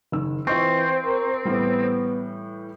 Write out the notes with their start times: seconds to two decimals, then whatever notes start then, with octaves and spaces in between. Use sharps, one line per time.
0.12 F#1 D#3 E6
0.47 E3 C4 F4 D#5 C#6
1.05 A#4
1.45 A2 E3 G3 B3